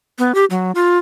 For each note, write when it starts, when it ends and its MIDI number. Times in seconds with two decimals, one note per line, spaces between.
0.19 0.35 59
0.35 0.45 67
0.50 0.71 54
0.75 0.98 65